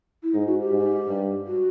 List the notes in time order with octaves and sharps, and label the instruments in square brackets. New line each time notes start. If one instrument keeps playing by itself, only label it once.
[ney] E4
[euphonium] G#2 [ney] D#4
[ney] F#4
G4
[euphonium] G#2
G2
[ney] F#4